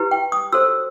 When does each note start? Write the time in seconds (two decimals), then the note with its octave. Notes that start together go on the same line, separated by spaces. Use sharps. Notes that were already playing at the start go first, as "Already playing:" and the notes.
Already playing: E4 G4 B4
0.11 G5
0.32 D#6
0.52 F#4 A4 C5 E6